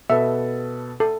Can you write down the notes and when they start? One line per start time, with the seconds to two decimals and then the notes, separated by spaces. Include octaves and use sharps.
0.10 B2 A4 B4 E5
1.00 A4